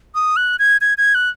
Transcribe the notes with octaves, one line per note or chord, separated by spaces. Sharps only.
D#6
F#6
G#6
G#6
G#6
F#6